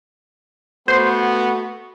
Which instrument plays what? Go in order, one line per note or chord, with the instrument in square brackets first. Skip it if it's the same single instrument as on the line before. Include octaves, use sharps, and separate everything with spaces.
[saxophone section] A3 F#4 [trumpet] B3 [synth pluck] C5 C6